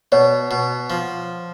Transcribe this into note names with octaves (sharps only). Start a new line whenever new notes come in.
B2 C#5
B2
F3